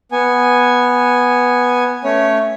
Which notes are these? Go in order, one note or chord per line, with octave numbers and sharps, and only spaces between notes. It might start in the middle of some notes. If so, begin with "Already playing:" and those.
B3 G#5
A3 C#4 C#5